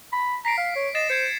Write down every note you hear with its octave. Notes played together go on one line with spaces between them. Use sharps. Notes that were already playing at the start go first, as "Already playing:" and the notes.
B5
A#5 B6 C7 D7
F5
C#5
D#5 A6 C7 E7
C5 G#6 C7 C#7